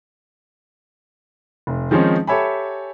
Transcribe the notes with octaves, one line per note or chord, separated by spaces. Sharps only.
F1
D#3 F3 G#3 C4 C#4 D#4
G4 A4 C#5 E5 G#5 B5